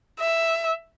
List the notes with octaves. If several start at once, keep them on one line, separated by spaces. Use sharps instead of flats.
E5